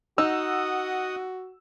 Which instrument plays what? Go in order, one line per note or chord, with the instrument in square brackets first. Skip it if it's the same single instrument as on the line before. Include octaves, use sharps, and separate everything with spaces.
[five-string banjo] D#4 [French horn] F#4 [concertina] D#5 F#5 D#6 [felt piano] E6